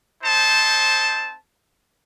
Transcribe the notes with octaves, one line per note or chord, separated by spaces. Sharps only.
C4 D#4 C5 A5